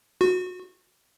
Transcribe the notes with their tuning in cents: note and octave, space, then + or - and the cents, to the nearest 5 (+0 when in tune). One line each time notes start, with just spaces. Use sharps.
F#4 -25